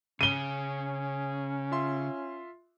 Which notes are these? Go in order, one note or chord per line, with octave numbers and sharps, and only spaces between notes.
C#3 C#4 D#7 G7
F4 E5 C6